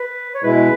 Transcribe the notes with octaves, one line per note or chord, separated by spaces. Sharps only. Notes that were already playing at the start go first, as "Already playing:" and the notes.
Already playing: B4
C#5
B2 G#3 E4 B4